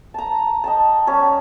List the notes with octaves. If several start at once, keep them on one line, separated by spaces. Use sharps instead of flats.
A5 A#5
D#5 G5 A5
G3 C#4 G4 A5